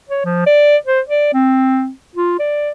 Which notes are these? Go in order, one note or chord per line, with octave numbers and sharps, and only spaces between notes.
C#5
F3
D5
C5
D5
C4
F4
D5